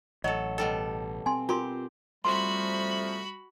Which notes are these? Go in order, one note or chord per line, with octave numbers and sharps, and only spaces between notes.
A1 F#3 A4 D#5
B2 G3 A4
C4 G#5 C6
F4 G4 A#4 C6
C3 F3 G3 A3 F#4 B5 C6